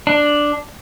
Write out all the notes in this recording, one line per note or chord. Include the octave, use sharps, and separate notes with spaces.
D4